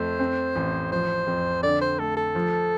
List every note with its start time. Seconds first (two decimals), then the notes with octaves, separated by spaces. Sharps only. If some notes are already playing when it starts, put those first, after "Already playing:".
Already playing: F2 A3 C5
0.19 C4
0.56 A1
0.91 F3 C5
1.27 F2
1.63 D3 D5
1.81 C5
1.99 A3 A4
2.17 A4
2.35 F3